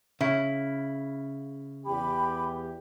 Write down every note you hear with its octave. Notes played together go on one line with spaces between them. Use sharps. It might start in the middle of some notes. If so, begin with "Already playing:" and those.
C#3 E4
E2 G4 B5